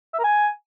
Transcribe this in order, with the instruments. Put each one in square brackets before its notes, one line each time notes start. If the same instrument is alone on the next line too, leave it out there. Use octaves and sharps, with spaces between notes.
[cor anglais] E5
A#4
G#5